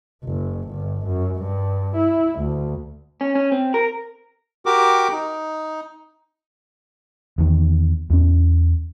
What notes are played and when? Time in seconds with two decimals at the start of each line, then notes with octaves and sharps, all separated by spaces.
0.25 F#1
0.70 G1
1.07 F#2
1.37 G2
1.97 E4
2.40 D2
3.21 C#4
3.35 C#4
3.52 C4
3.74 A#4
4.66 F#4 G4 A#4 D6
5.12 D#4
7.38 E2 D#3
8.10 E2 C#4